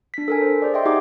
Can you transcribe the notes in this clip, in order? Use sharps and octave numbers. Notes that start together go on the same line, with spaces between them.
D4 B6
A4 A#4 G#5
C5
G#4 C5 D5
D#5 E5 G5 C6
D#4 G4 G#4 F#5 G5 D6